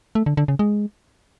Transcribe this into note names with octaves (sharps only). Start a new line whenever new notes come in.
A3
D3
D3
C#3
G#3